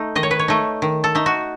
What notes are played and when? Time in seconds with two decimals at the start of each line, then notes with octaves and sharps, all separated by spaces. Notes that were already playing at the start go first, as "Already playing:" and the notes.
Already playing: A3 D#4
0.15 D#3 D#5
0.23 C#5
0.31 B4
0.39 C#5
0.48 A3 D#4
0.82 D#3
1.04 A4
1.15 A3 D#4
1.26 F#4